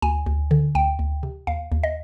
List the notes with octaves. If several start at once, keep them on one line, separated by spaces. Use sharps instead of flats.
D2 G#5
D2
D3
D2 G5
D2
C3
D#2 F5
D#2
D#5